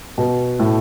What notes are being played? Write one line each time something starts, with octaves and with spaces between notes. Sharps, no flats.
B2
A2